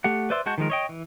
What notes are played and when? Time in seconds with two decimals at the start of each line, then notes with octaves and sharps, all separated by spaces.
0.04 A3 G4 F#5
0.30 B4 C5 D5 E5 C6
0.46 G#3 F#4 F#5 A5 G6
0.58 D#3 F3 G#3 A#4
0.70 C#5 D#5 G5
0.89 E3